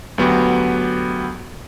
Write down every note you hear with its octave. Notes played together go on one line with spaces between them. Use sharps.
D2 F#3 B3 F#4 G4 C#6